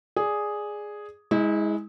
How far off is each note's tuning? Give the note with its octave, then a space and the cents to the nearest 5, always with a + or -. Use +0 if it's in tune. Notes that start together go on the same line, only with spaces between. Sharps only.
G#4 +0 D5 +0
G#3 +0 E4 -35